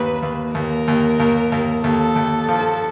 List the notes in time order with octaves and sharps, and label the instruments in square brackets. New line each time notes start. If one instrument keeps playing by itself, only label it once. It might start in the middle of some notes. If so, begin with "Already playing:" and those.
Already playing: [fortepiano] D#2 A#3 [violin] B4
[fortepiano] D#2
[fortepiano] D#2 [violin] A#4
[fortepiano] D#2
D#2
D#2
[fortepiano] D#2 [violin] A4
[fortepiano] D#2
F3